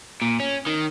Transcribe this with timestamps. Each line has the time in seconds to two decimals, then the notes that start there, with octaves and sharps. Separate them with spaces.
0.22 A#2
0.40 C#4
0.67 D#3